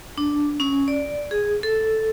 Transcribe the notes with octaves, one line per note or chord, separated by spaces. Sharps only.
D4
C#4
D5
G#4
A4